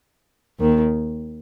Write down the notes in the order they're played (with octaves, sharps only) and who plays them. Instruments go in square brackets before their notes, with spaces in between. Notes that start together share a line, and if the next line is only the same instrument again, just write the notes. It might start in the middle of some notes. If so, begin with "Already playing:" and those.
[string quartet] D#2 D#3